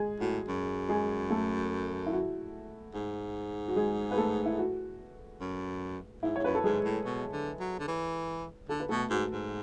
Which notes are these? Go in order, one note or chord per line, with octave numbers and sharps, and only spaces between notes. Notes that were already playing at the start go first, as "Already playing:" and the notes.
Already playing: G#3 G#4
A2 F#4
F#2
G#3 G#4
A3 A4
E4
F#4
G#2
F#4
G#3 G#4
B4
A3 A4
E4
F#4
F#2
G#2 E4
G#2 C#5
F#2 B4
A4
G#2 G#3 G#4
A2
B2
D3
F#3
D3
E3
D3 A4
B4
B2 A3 A4
G#2 F#4
G#2